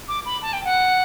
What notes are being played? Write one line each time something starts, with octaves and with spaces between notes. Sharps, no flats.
D6
B5
A5
G5
F#5